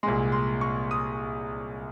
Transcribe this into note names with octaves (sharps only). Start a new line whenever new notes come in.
C2 A#2 G#3 C6
C6
C#6
D#6